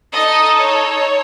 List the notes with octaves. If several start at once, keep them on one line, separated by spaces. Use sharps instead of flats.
D#4 A4 D#5
C#5